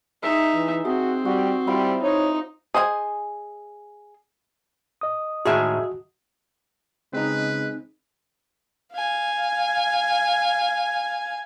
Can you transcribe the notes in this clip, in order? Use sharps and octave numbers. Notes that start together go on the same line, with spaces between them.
G#3 D#4 E5
E3
C4 F#4 G#4
G3 F#4
G3 E4 F4 C5
D#4 C#5
G#4 C5 D#5 F#5 G#5
D#5 D#6
A2 D#3 G#3 F#4 G#4 E5
C#3 G#3 C4 D#4 B4
F5 G#5